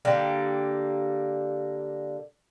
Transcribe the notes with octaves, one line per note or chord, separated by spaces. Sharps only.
D3 G3 A#3